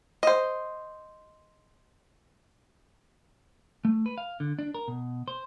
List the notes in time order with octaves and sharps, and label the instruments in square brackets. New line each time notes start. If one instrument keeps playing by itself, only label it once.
[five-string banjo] C5 D#5
[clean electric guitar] A3
B4
F5
D3
D4
A#4
B2
C5